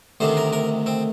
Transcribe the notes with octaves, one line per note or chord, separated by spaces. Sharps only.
D2 C3 D#3 C5
A#4
A#4
C4